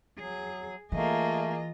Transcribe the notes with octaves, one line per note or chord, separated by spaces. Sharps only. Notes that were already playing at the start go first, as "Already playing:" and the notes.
F#3 G#4
E3 A3 A#3 F4 G#4 D#5